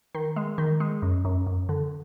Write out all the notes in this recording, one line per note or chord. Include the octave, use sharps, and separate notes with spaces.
D#3
G#3
D#3
G#3
F#2
F#2
F#2
D3